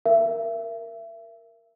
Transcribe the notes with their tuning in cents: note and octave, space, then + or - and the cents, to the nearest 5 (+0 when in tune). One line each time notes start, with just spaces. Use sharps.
A#4 +0 E5 +30